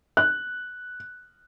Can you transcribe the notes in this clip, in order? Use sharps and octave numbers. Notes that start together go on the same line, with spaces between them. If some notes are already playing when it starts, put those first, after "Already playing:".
F#6